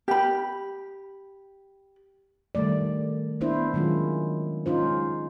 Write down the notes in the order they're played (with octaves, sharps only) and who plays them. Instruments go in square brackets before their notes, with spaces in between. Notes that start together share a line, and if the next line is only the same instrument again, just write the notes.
[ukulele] G4 B5
[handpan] D#3 G3 A3 D5
A#3 B3 D4 E4 C5
D#3 F#3 G#3 C#4 F4
C#4 D#4 F4 C5
G#3